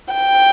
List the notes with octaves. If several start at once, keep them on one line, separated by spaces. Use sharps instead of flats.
G5